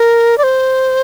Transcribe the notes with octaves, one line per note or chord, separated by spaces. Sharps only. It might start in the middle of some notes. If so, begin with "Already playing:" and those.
Already playing: A#4
D5
C5